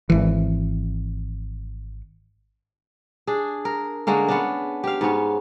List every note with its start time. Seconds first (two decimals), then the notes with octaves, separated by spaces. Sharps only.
0.10 G#1 E3
3.27 D4 G#4
3.65 A#4
4.07 D3 G#3 A#3 C#4
4.28 B3 C#4 D4
4.84 G4 F5
5.01 G#2 B3 C#4